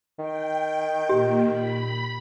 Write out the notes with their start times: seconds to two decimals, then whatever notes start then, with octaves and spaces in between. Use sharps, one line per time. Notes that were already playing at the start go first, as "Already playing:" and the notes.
0.19 D#3 G5
1.09 A#2 G4
1.50 B5